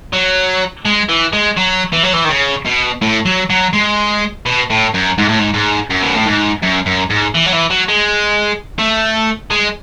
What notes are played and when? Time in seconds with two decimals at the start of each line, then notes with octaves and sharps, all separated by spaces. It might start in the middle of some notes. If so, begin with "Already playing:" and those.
0.13 F#3
0.85 G#3
1.09 E3
1.33 G#3
1.57 F#3
1.93 E3
2.03 F#3
2.13 E3
2.25 D#3
2.29 C#3
2.65 B2
3.02 A2
3.25 F#3
3.50 F#3
3.73 G#3
4.46 B2
4.70 A2
4.94 F#2
5.18 G#2
5.29 A2
5.39 G#2
5.54 G#2
5.90 F#2
6.03 B2
6.14 A2
6.26 G#2
6.62 F#2
6.86 F#2
7.10 G#2
7.35 E3
7.46 F#3
7.53 E3
7.70 F#3
7.88 G#3
8.79 A3
9.51 G#3